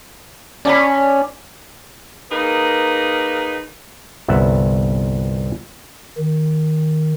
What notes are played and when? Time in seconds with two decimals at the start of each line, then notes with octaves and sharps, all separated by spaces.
0.65 C#4 D5 A5 B5
2.31 A#3 D#4 G#4 A#4 B4
4.28 G1 C2 B3 E5 F#5
6.18 D#3